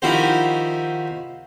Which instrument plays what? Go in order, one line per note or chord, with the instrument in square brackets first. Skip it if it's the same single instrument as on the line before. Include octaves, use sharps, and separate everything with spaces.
[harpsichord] D#3 F3 E4 F#4 G4 C5